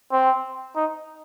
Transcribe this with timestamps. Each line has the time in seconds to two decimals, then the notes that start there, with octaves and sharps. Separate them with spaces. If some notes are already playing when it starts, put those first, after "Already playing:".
0.12 C4
0.76 D#4